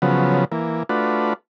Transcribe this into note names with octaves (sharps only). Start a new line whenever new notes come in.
C#3 F3 F#3 B3
E3 A#3
A3 D4 F4 F#4 B4